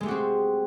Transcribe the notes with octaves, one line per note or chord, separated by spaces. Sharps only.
G#3 A3 C4 F#4 G4